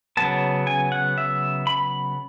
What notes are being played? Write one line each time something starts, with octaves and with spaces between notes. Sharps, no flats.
C#3 F#3 B3 A5
G#5
F#5
E5
B5